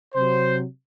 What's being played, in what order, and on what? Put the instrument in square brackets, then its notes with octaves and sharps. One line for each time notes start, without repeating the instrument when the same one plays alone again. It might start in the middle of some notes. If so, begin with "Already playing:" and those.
[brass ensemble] C3 F#3 C5